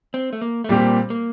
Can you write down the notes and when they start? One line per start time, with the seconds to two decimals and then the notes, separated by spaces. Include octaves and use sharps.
0.14 C4
0.33 A3
0.42 A#3
0.64 A3
0.69 A#2 G3 A#3 C4 G4
1.10 A#3